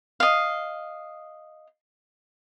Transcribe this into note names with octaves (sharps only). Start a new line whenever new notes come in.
D#5 F5